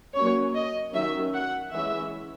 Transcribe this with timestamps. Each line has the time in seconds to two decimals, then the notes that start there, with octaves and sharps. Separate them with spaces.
0.15 F#3 A#3 C#4 C#5
0.55 D#5
0.94 D#3 F#3 C#4 E5
1.34 F#5
1.74 E3 G#3 C#4 E5